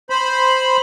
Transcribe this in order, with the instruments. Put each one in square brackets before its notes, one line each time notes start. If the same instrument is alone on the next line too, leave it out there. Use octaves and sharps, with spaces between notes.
[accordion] C5 B5